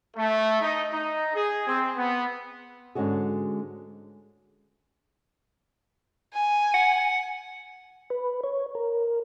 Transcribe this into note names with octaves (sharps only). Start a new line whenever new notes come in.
A3
D#4
D#4
G#4
C4
B3
G#2 D3 G#3 C#4 F#4 G#4
G#5
F#5
B4
C#5
A#4